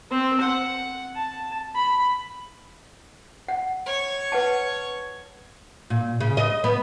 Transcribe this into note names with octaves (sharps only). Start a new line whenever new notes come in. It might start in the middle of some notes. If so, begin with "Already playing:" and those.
C4
F#5
A5
B5
F#5
C#5
B4 F#5 A5
A#2
C#3
D#5
B3